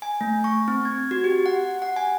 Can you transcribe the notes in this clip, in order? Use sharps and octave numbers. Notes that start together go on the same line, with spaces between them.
G#5
A3
C#6
C4
G#6
F#4
G4
F#5
F#5
G#5